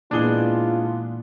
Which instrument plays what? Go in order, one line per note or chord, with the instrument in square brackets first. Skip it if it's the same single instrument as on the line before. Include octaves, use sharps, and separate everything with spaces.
[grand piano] A#2 G7 [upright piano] E3 G#3 B3 [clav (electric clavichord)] D4 G#4 [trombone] F4